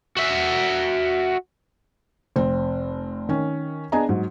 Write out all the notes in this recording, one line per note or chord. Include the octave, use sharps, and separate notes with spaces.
F#4 E5
F1 C4
D#3 C#4
B3 D4 G#4 D#5 G#5 A#5
G#2 F#3